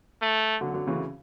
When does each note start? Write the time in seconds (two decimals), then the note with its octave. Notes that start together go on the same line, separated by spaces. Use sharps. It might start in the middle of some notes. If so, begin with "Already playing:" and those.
0.22 A3
0.61 D3 F#3
0.74 D3 F#3
0.87 C#3 E3